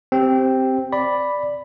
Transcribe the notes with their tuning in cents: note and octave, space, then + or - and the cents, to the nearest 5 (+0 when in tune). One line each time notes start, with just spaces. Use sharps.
C4 +0 G4 +0
D5 +0 B5 +0